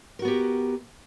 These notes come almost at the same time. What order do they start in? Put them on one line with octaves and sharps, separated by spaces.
A#4 F#4 B3 G4